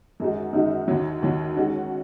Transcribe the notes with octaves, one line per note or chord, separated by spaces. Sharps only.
F#2 D#3 G#3 D#4 F#4
F#2 D#3 G#3 D#4 F#4
D#2 D#3 F#3
D#2 D#3 F#3
D#3 G#3 C#4 F#4